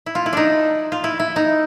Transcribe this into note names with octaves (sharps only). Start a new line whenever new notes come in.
E4
F4
E4
D4 D#4
F4
E4
E4
D#4